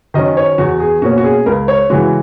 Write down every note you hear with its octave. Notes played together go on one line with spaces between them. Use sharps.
D#3 F#3 C#4 D#5
C#5
E2 F#4
G#4
B2 A#3 C#4 F#4
F#4
G#4
C#2 A#4
C#5
C#3 E3 G#3 F#4